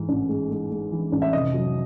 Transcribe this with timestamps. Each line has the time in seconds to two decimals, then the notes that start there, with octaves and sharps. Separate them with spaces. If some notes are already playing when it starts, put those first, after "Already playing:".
Already playing: G#2 E3
0.09 A1
0.29 G#3
0.50 G#3
0.71 G#3
0.92 E3
1.12 A1
1.22 E5
1.33 F1 D#5
1.54 F#3